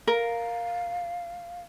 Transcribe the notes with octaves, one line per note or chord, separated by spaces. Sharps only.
A#4 F5